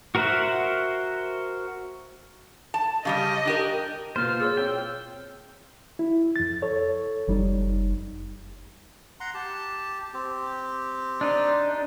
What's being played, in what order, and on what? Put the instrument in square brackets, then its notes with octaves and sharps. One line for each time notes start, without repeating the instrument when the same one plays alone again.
[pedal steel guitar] F#4 A#4 C5 E5 F#5
[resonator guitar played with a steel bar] A5
[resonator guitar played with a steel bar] C#3 G3 C#4 [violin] D#5
[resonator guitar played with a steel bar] D4 G4 A#4
[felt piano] B2 A#3 [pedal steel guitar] F4 C5 [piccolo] F6
[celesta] G#4 C#5 [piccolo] E6
[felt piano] C4 F6 [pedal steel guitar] G5
[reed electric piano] E4
F2 A6
A4 C#5
[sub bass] F#1 [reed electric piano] F2 G3 D#4
[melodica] F#5 A#5 C6
G4 A5
C4 G4
[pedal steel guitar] D4 D#4